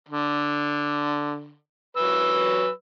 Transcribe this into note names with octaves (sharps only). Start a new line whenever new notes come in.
D3
F#3 B4 E6